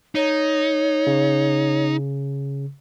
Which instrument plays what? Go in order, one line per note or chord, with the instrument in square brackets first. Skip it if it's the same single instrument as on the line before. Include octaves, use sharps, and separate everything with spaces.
[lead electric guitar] D#4 [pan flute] C#5
[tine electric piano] C#3